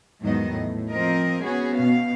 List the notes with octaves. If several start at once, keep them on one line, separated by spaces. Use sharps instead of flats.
E2 G#2 D#3 F#3 B3 D#5
A2
F3 C4 A#4 D#5
B3 C#4 F#4 G#4
B2 F5